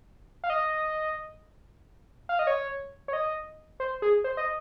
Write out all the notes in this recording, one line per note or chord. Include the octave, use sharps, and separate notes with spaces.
F5
D#5
F5
D#5
C#5
C#5
D#5
C5
G#4
C5
D#5